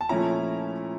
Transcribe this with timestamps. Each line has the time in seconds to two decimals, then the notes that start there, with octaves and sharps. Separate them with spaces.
0.01 A5
0.09 A#2 F3 A3 C#4 E4 A#5